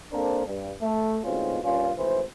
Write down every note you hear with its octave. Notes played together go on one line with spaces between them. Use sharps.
A#3 C4 D4 A4 A#4 C5
G2
A3
D2 G#2 B2 C4 C#4 F4
G2 A#2 C#4 F4
G#1 A2 E3 C5